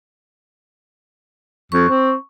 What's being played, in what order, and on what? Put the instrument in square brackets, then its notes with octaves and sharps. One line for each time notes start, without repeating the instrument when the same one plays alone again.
[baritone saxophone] F2 [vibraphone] C#6
[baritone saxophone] C4